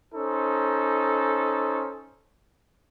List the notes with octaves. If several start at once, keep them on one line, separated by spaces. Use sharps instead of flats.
C#4 D#4 A4 C5